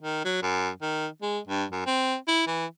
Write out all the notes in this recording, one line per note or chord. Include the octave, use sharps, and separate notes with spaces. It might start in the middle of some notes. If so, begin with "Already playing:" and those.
D#3
F#3
F#2
D#3
G#3
G2
F#2
C4
E4
E3